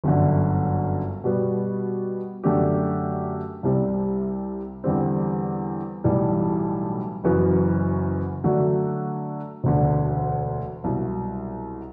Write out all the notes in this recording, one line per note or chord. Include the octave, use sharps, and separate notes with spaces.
G1 F#2 D3
B2 G3 B3
F#2 D3 A3 D4 G4
C2 C3 G3 C4
E2 D3 G3 C4
B1 A2 E3 G3
F#1 F#2 E3 B3 F#4
D3 F#3 A3 D4 F#4
E1 D2 D3
C2 B2 F#3